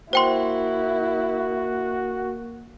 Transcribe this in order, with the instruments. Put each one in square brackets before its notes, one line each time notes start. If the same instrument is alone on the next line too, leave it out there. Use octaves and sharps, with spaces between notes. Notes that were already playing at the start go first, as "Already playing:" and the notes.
[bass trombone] A#3 [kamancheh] E4 [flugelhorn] F#4 [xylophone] C5 G5 C6